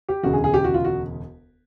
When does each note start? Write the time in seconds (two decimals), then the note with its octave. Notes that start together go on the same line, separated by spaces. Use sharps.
0.09 G4
0.23 E1 D2 C#3 F#4
0.33 G#4
0.44 G#4
0.54 G4
0.64 F#4
0.74 F4
0.84 F#4